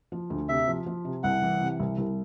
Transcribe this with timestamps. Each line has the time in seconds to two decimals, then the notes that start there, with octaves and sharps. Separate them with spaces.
0.12 F3
0.30 D2
0.49 C3 E5
0.68 F3
0.86 F3
1.05 C3
1.23 C2 F#5
1.42 E3
1.61 C3
1.80 C2
1.98 C2